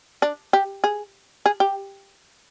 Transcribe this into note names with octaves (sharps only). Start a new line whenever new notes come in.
D4
G4
G#4
G#4
G4